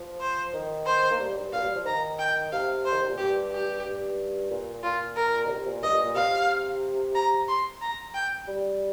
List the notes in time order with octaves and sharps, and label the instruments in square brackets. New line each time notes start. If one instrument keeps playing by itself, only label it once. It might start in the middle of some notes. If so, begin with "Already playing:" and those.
Already playing: [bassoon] F3
[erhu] C5
[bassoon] D#3
[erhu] C5
[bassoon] A#3
G3
G2
[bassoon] A#2 [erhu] F5
[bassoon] G3
F3
[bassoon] D#3 [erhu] A#5
[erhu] G5
[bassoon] C3 [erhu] F5
[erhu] C5
[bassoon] D#3
C3
A#2
[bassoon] G2 [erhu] G4
[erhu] G4
[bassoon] G2
A#2
[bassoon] A#2 [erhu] F4
[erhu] A#4
[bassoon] D#3
C3
A#2
[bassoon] G2 [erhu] D#5
[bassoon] A#2
A#2
[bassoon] C3 [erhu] F5
[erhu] A#5
C6
A#5
G5
[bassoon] G3